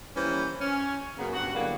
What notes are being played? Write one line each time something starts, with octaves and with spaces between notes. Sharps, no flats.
E3 G3 A#3 C#4 B4 C5
C#4
F#2 C#3 A#3 B3
G2 C#3 F#4 F#5
D3 F#3 G3 A#3 B3 E4